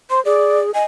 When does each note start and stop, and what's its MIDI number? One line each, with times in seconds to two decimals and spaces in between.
0.10 0.24 72
0.10 0.20 84
0.25 0.73 68
0.25 0.59 74
0.74 0.86 75
0.74 0.83 80